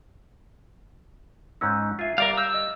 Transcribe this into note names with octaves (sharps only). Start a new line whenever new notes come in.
G#2 C#4 D#4 E6 F#6 G6
F4 E5 G#5 C7
G3 A#4 D5 F5
E6 F6 G6
D#5